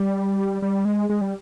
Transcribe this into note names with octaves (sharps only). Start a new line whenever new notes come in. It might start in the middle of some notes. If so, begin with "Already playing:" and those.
Already playing: G3
G3
G#3
G#3
G3